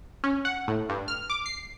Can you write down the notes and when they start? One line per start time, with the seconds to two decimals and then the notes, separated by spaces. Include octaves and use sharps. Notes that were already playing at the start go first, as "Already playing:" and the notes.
0.24 C#4
0.45 F#5
0.68 A2
0.89 G2
1.08 F6
1.30 D6
1.46 C7